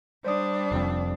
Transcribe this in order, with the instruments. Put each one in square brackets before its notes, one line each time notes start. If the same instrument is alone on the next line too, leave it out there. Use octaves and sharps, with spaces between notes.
[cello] G3 D4 [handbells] C5 D5 D#6
[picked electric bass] F1 F2